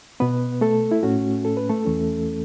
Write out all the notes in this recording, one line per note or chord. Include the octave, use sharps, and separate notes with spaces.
B2 B3 B4
A3 A4
E4
A2 A3 C#4 F#4
A4
B4
A3 A4
E2 E3 A3 C#4